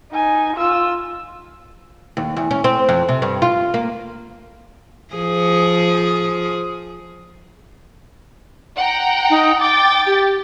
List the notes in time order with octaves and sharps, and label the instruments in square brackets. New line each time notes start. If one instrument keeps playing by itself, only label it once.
[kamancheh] D#4 G#5
F4 E6
[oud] D#2
E2
C#4
C4
F2
C3
G2
F4
A#3
[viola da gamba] F3 G#4
[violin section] F#5 G5 A#5
[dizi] D#4
[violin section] G5 A6 [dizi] D6
[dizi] G4